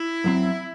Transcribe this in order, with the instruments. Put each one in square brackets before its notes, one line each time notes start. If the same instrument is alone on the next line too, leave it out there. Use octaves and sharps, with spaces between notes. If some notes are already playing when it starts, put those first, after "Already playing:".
Already playing: [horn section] E4
[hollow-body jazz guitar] F#2 F#3 C4